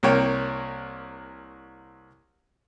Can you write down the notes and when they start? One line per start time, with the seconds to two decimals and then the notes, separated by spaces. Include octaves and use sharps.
0.03 C2 A#3 C#5 G5